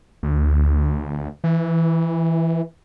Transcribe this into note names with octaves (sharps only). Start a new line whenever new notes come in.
D2
E3